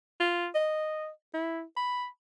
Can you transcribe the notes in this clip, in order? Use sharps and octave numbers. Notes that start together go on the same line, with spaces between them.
F4
D#5
E4
B5